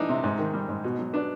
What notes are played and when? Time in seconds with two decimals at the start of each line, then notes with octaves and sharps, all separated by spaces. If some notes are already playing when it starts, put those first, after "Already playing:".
Already playing: E3 B3 D4 D#4
0.09 C3
0.24 G#2
0.38 D#3
0.53 G3
0.69 G#2
0.84 B2
0.99 F#3
1.13 B3 D4